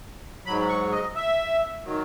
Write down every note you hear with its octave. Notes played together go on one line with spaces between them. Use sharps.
G#2 F#3 B5
C#6
D#5
E5
D#3 F#3